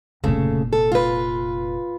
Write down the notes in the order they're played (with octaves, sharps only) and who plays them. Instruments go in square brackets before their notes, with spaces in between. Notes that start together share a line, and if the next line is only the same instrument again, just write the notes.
[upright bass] F1 A#2 [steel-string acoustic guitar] C#3 A3
[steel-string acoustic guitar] A4
F4 B4